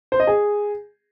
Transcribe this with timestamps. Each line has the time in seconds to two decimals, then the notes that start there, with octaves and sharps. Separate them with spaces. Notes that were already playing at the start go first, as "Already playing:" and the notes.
0.12 C5
0.20 D#5
0.27 G#4